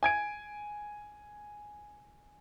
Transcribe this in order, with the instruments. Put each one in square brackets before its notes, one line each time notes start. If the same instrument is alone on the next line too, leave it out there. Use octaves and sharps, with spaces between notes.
[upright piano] G#5 G#6 D7